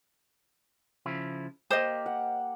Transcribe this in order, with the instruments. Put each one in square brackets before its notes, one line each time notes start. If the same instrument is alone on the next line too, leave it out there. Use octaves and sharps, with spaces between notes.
[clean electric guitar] C#3 F3 E4
[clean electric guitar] A#3 G4 [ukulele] C5 D#5
[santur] F#5